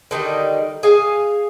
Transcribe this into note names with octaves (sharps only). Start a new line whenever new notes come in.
D3 D#3 G3 D#4
G#4 F5 G#5